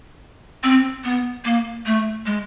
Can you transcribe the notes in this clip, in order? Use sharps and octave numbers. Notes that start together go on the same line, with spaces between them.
C4
B3
A#3
A3
G#3